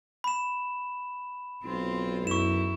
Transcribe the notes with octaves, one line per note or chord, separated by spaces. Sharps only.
B5 E7
B1 C4 F4
F#2 E4 C#6 E7